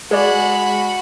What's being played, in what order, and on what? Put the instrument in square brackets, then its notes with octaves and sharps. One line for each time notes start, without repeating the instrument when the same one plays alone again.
[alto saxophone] G#3 [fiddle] F#4 B5 [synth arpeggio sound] G#4 D5